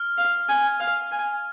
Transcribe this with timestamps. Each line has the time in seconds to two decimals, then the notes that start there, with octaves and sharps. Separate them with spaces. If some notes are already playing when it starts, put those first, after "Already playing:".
Already playing: F6
0.18 F5
0.49 G#5
0.80 F5
1.11 G#5